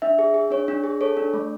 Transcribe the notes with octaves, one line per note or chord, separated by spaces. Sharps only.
D4 E5
G#4
G#4
D4 C#5
D4
G#4
A4 C#5
D4
A3